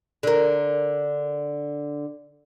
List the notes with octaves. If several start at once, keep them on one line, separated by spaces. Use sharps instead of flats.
D3 A#4